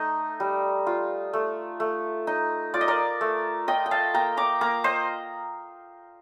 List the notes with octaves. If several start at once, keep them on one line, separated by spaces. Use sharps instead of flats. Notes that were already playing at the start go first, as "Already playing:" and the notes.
Already playing: A3 D#4
G3
F4
A3
A3
D#4
F4 D5
D#5
A#4 D5
A3
F4 D#5 G5
G5
F5 A5
A#3 G5 A#5
A#5 D6
A#3 A#5 D6
C5 D#5